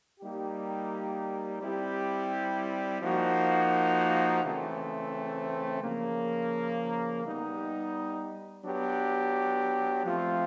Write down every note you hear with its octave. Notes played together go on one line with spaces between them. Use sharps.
G3 A#3 D#4 G4
G3 C4 E4 G4
F3 A#3 D#4 F#4
C#3 E3 A3 C4
C#3 F3 A#3
G3 B3 D#4
F#3 B3 D4 G4
F3 A3 C4 F4